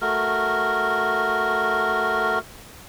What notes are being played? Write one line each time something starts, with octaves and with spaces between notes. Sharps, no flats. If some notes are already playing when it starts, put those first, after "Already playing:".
A3 F#4 A#4